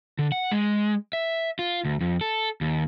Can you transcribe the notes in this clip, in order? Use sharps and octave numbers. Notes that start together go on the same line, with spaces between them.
D3
F#5
G#3
E5
F4
D2
F2
A4
D#2